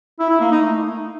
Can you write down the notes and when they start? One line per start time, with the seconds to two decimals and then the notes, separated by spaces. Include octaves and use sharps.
0.20 E4
0.30 E4
0.41 A#3
0.51 D#4
0.62 A3